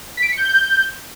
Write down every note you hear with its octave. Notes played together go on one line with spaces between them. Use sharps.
B6
D7
B6
C#7
G6